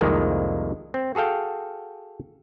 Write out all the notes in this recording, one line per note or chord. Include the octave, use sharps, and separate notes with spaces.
C2 F2 C3 D#3 G#3 A#3
C4
F#4 G#4 A4 F5 G5